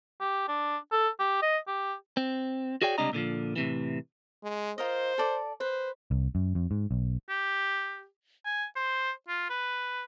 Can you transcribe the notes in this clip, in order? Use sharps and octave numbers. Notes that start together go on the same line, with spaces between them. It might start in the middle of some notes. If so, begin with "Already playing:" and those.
G4
D4
A4
G4
D#5
G4
C4
F#4 G#4 C#5 D5 G5
C#2 C3 G3 D4 D#5 A#5
A#2 D3 E3 F3
A2 C3 E3
G#3
F4 A#4 C5 D#5
A4 D5 D6
B4 C5
C2
F#2
F2
G#2
B1
G4
G#5
C5
F4
B4